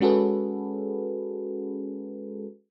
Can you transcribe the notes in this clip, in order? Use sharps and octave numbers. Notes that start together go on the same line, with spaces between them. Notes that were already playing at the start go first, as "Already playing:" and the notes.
G#3 C#4 F#4 G#4 A4 B4